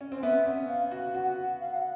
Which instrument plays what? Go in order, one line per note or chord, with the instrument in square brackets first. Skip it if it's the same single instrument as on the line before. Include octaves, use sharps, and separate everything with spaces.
[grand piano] C#4
C4
[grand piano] B3 [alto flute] E5
[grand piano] C#4
[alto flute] F5
[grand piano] F#4
[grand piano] F#4 [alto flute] F#5
[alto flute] F5
F#5